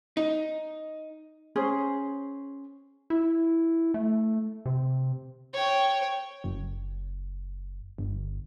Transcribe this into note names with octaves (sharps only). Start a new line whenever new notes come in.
D#4
C#4 G#4 C5
E4
A3
C3
C#5 G5
F#1
G1